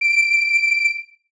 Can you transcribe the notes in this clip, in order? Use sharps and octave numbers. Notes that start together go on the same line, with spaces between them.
D7